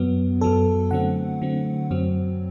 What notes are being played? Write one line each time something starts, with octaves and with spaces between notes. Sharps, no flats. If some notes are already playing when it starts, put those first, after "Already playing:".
Already playing: F#2 F#3 B3
F#2 F#3 B3 A4
D3 F#3 A3 C4 F#5
D3 F#3 A3 C4
F#2 F#3 C4